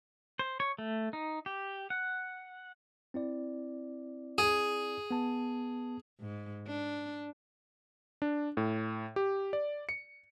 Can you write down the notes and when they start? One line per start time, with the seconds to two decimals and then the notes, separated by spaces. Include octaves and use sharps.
0.39 C5
0.60 C#5
0.79 A3
1.13 D#4
1.46 G4
1.90 F#5
3.14 C4 E4 D5
4.38 G#4
5.11 B3 A5
6.20 G#2
6.67 D4
8.22 D4
8.57 A2
9.16 G4
9.53 D5
9.89 C#7